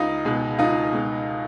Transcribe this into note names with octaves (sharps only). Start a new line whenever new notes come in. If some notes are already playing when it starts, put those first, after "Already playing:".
Already playing: C#2 D#4 F4
B2 G#3
C#2 D#4 F4
B2 G#3